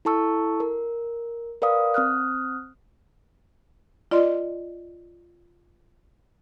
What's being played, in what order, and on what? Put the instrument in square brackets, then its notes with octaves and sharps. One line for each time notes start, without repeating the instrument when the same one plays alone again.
[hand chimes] E4 A4 A5 C#6 E6
A#4
A#4 B4 D5 F5 D#6
C4 D#6 F6 F#6
[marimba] F4 D5 D#5 C6